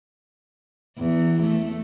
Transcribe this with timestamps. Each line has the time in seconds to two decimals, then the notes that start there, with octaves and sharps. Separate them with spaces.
0.98 E2
1.43 A3